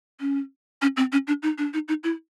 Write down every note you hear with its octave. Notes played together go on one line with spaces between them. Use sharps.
C#4
C#4
C4
C#4
D4
D#4
D4
D#4
D#4
E4